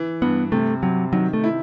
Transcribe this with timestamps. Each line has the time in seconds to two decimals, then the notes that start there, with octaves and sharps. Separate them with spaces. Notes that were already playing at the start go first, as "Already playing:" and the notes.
Already playing: E3
0.22 G2 B3
0.52 C3 A3
0.83 C3 F#3
1.13 D#3 F#3
1.33 A3
1.44 E4